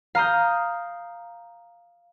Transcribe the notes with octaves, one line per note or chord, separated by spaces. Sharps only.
F5 A#5 D#6 G6